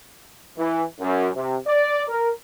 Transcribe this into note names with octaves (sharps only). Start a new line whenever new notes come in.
E3
F#2
C3
D5
A#4